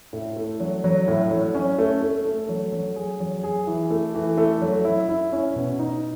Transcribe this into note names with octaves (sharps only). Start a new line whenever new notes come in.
A2
A3
F#3
F#3
A2
F#3
C#4
A3
A3
A3
F#3
F#3
G#4
F#3
G#4
E3
A3
E3
A3
F#3
E4
E4
C#4
B2
D#4